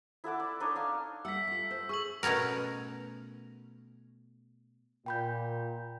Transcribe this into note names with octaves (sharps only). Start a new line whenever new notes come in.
E4 A4 F#5 D6
D5
D4 D#4 C#5 D#5
D4 F5
G3 A3 F#5 E6 B6
A3 F4
C5
G#4 C#6 E6 F#7
B2 A3 B3 C#4 A#4
A#2 G5 B5 G6